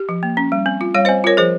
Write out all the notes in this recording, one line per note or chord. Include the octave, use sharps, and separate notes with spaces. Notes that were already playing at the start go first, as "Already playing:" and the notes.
Already playing: G4
F3
A#3
C#4
G3
C4
F4
G3 C#5 F5
C4 C5 D#5
F4 A#4 C#5
F3 G#4 C5